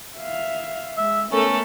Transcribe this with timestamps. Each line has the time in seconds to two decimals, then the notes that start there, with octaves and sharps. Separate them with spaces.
0.18 E5 F5
0.97 G#3 E5
1.32 A3 B3 C#4 A4 A#4